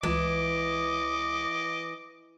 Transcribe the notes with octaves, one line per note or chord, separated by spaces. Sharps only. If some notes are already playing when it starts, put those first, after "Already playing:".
C#2 E3 D#5 D6